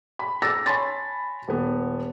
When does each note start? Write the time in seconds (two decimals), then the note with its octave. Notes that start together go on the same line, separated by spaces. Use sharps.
0.19 B5
0.42 D6 E6 A6 A#6
0.66 C#5 G#5 A5 B5 C6 A6
1.48 D#1 B3